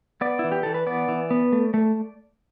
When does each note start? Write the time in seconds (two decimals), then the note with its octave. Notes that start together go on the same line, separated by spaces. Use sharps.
0.21 B3 D5
0.39 E4
0.44 E3
0.52 G4
0.63 E3 A4
0.74 B4
0.87 B3 D5
1.08 E3
1.31 B3
1.52 A3
1.74 A3